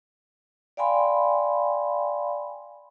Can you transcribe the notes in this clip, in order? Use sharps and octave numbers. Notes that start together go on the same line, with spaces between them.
D5 F5 G5 G#5 B5 C6